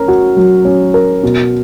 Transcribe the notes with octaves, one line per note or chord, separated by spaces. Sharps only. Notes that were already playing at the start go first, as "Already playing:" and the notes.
Already playing: C#4 A#4
F#4
F#3
C#4
A#4
B2